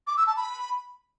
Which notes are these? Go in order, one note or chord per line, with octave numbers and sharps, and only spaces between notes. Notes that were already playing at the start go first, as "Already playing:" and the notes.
D6
E6
A5
B5